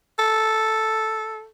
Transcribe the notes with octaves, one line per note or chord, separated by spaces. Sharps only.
A4